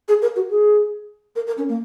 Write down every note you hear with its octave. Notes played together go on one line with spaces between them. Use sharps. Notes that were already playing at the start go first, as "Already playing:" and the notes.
G#4
A#4
F#4
G#4
A#4
A#4
C#4
A#3